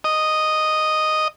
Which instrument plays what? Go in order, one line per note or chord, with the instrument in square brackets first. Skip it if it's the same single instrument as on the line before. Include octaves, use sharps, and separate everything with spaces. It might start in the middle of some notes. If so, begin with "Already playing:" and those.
[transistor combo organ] D#5